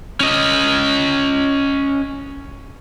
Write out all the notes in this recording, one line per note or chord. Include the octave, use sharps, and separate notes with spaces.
C#4 D#5